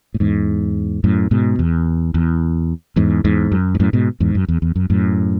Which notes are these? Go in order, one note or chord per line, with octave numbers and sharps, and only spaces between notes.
A2
E2 G#2
F#2 A2
G#2 B2
E2
E2
E2 G#2
E2 G#2
F#2
G#2
F#2 A2
G#2 B2
E2 G#2
F#2
E2
E2
F#2
F#2 A2